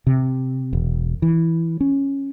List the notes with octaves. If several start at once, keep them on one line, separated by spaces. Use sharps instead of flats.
C3
E1
E3
C#4